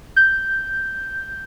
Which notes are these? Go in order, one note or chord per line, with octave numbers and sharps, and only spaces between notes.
G6